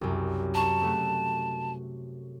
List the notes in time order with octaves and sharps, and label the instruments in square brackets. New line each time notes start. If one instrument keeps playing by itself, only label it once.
[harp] C2 F#2
[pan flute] A5 [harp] A#5 C#6
[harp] C3 A3 F#4